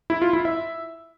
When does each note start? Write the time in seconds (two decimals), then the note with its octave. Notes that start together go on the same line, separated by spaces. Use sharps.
0.10 E4
0.22 F4
0.33 E4
0.45 E5